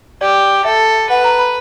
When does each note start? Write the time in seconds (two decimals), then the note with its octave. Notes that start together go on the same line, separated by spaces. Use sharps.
0.21 G4 D5
0.65 A4 E5
1.09 B4 F#5
1.24 A#5
1.39 B5